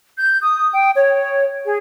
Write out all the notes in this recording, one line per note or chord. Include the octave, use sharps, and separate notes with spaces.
G6
D#6
G5
C#5
G#4